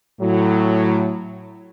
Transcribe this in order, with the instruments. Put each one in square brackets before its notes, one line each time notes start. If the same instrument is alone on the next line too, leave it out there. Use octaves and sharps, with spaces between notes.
[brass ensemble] A2 F#3